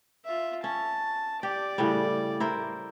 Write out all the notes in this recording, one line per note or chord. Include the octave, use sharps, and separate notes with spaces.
F4 E5
C#4 A5
G4 D5
A2 C#3 G3
E4 A#4 C5